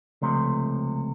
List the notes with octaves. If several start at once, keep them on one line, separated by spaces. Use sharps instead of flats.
C#2 C3 F3 A3